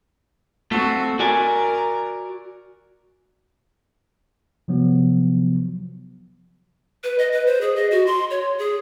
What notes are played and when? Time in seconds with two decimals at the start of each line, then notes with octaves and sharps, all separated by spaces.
0.72 A3 C4 F#4
1.19 F#4 A#4 D5 G#5
4.68 C3 F3 F#3 B3
7.04 B4
7.19 D#5
7.32 B4
7.47 C5
7.61 G#4
7.76 D#5
7.91 F#4
8.06 C6
8.30 C#5
8.59 G#4